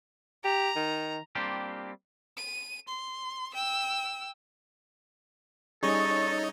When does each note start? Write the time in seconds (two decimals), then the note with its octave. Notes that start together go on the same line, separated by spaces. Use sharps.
0.44 G4 A#5
0.76 D#3
1.35 G3 A#3 C4 D4 F4 G4
2.37 D#7
2.88 C6
3.54 G5 E6
5.83 G3 C#4 D#4 G#4 A4 C#5 D#5 C#6